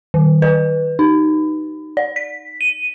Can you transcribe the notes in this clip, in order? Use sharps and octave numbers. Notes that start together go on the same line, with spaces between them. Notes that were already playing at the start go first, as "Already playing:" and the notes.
D#3
B4
D#4
D5
B6
D#7